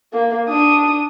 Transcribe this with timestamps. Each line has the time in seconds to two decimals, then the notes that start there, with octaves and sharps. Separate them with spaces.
0.13 A#3
0.48 D4 D#6